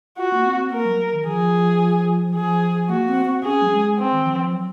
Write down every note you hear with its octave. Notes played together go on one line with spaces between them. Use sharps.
F4 F#4
A#3
C4
A#3 A#4
F#3
D#3
F3 G#4
F3 G#4
A#3 F#4
C4
C4
C#4 G#4
F#3
G#3
C4
D#3
F3
F3
F#3